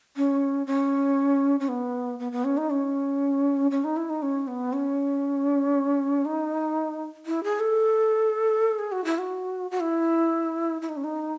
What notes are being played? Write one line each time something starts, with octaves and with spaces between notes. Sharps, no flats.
C#4
C#4
C#4
B3
B3
B3
C#4
D#4
C#4
C#4
D#4
E4
D#4
C#4
B3
C#4
D#4
E4
G#4
A4
G#4
F#4
E4
F#4
F#4
E4
E4
D#4
C#4
D#4